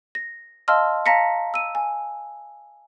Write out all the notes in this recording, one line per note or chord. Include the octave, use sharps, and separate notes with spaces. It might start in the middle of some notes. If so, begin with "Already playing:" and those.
A#6
D#5 F5 A5 C6 E6 F6
F5 A5 A#5 A#6 B6 C#7
E6 D#7
G#5